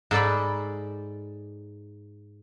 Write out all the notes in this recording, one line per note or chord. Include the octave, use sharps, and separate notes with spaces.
G#2 A4 D5 B5